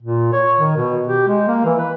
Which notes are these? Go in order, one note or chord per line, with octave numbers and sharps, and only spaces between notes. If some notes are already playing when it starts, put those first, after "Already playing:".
A#2
C#5
D#3
B2
G4
G#3
A#3
E3
B4